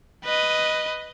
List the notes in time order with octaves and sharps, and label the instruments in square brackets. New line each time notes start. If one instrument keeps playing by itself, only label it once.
[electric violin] B4 D#5